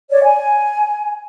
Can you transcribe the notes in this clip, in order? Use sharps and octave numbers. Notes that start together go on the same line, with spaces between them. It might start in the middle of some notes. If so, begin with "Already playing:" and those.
C#5 D5
G#5